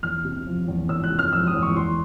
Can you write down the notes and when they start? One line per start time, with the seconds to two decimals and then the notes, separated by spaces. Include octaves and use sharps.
0.03 E2 F6
0.24 C3
0.46 F3
0.68 E2
0.89 E2 E6
1.04 F#6
1.11 C3
1.19 F6
1.32 F3 E6
1.47 D#6
1.54 E2
1.62 C#6
1.76 E2 C6